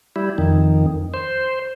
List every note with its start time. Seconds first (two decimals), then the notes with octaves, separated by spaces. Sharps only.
0.16 G3 E4
0.38 F2 D#3
1.14 C5